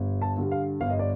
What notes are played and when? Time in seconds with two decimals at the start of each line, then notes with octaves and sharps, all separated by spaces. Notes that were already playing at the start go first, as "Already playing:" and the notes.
Already playing: G1
0.22 A5
0.37 G2 D3 G3
0.51 F5
0.80 G1 F5
0.90 D#5
0.99 D5